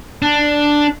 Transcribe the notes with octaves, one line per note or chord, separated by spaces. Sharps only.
D4